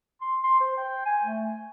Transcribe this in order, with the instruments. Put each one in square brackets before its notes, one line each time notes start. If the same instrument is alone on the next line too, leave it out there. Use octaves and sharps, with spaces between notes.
[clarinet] C6
C6
C5
G5
G#5
A3